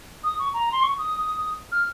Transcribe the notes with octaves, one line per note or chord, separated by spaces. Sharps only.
D#6
C#6
A#5
C6
C#6
D#6
F6